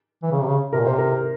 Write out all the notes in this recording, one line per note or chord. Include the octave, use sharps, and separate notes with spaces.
E3
C#3
C3
C#3
C3 A#4
A#2
C3 C5
A#4